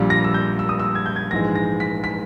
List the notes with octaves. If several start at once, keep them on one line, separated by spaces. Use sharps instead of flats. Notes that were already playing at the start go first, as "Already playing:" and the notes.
Already playing: A#1 A#2 G3
A#6
E6
G6
E6
D#6
E6
G#6
G6
G#6
A#1 G#2 E3 G#3 A#6
A#6
B6
B6